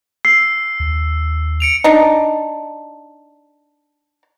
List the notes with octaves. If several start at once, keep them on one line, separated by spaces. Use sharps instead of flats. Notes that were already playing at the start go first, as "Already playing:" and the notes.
E6 C7
D#2
C#7 D7 F7
D4 D#4